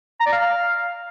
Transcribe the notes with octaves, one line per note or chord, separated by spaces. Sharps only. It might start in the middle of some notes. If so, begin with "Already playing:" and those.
A#5
D5
F5